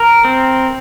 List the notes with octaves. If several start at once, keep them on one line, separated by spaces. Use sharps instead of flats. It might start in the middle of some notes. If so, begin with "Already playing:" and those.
Already playing: A#4
C4